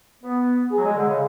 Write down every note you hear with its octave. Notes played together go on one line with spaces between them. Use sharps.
B3
G#4
F#3
G#3
D3
C#3